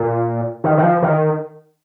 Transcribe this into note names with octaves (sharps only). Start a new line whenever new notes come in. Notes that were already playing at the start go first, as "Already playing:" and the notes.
Already playing: A#2
D#3
D#3
F3
D#3